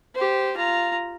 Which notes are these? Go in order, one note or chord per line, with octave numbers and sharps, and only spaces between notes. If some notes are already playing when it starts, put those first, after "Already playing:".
G4 C5
F4 A#5